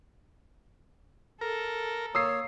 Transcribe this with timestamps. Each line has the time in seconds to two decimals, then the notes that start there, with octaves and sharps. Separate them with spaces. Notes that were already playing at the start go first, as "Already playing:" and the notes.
1.41 A4 A#4
2.15 A#3 C#5 D#6 E6 C7